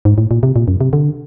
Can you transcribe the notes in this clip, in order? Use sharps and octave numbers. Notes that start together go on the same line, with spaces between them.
G#2
A2
A#2
C3
A#2
F#2
C3
D3